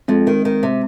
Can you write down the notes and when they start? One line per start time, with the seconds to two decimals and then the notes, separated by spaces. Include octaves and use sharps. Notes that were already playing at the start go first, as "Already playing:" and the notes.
0.08 F2 G#3 C4
0.27 D#3
0.45 D#3
0.63 C3